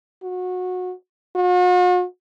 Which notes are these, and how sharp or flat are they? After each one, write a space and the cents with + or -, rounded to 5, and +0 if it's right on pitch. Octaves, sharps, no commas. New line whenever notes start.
F#4 -25
F#4 -45